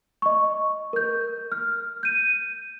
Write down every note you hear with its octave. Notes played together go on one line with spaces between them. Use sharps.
D#5 C#6
A#4 G6
F6
G6 D#7